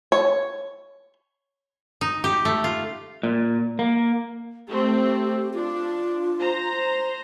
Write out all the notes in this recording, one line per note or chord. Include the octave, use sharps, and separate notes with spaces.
C#5
D#4
G4
A3
F4
A#2
A#3
A3 C4 G4
D4 F4
C5 A#5